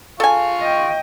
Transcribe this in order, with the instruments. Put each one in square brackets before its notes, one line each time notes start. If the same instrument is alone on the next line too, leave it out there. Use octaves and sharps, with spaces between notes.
[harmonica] F4 F5 C#6 [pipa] A4 G#5
[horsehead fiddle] D#5 G5